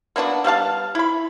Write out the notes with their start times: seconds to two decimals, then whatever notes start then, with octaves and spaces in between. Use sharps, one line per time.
0.16 A#3 B3 D4 F#4
0.44 G3 B3 F5 A5
0.95 E4 B5